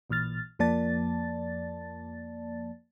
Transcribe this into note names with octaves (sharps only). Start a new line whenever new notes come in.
A1 A#2 E3 F6 A6
F2 F3 A#3 D5 A5 A6